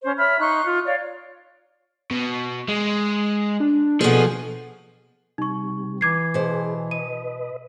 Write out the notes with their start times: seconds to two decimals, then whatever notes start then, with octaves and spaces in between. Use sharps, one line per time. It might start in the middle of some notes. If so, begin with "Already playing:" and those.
0.02 C#4 C5
0.17 C#5 E5 B5 F6
0.39 D#4 C6 C#6 F#6
0.64 F4
0.85 C#5 D5 F5
2.11 B2
2.69 G#3
3.60 D4
4.01 B2 F3 G#4 A4
5.38 C3 G3 D#4 C#6
6.01 E3 D6 G#6 C7
6.34 B2 G#4 C5
6.91 B4 D#5 D#7